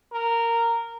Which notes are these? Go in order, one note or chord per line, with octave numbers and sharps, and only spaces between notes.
A#4